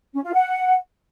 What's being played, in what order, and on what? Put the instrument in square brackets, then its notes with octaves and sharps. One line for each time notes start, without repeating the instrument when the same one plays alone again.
[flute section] C#4
F4
F#5